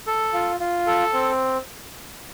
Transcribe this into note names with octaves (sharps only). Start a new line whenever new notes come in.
A4
F4
F4
A4
C4